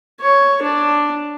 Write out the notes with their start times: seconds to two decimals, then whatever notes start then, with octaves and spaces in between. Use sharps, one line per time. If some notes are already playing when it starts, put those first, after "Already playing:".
0.21 C#5
0.63 D4